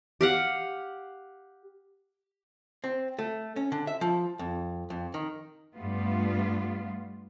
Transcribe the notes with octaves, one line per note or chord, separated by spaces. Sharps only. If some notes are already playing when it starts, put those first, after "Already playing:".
G4 F5 F#5
C4
A3
C#4
D3
E5
F3
F2
F2
D#3
G2 G3 A3 B3 F4